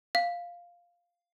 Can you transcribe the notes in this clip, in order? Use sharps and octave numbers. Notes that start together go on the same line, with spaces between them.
F5